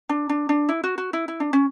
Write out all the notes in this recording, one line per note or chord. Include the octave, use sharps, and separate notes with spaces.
D4
D4
D4
E4
F#4
F#4
E4
E4
D4
C#4